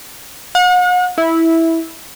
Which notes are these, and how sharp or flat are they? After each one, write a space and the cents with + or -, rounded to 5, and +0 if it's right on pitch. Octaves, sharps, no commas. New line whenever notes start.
F#5 -40
E4 -10